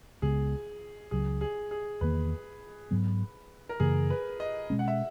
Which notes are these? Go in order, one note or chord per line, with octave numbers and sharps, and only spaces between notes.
C#2 C#3 G#3 B3 G#4
C#2 C#3 F#3 G#4
G#4
G#4
E2 D#3 A#3 B4
G#2 F#3 B3
A#4
F#2 C#3 E3 A#3 G#4
B4
D#5
B2 G#3 C#4
F#5
E5